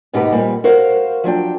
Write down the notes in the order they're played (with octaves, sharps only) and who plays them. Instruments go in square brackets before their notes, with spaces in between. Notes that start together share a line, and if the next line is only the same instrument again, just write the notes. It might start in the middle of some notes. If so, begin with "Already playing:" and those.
[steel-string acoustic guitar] D#2 G#2 B2 D#4 G4 B4
A#2 G3 A#3 C4
F#4 A#4 C5 F5
F3 F#3 D4 G5